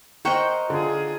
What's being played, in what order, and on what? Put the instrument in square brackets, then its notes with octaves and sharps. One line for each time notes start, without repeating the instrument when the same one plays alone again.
[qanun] A#4 C5 D#5 [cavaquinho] F#5 G5 C#6
[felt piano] D3 [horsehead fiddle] F4 G#4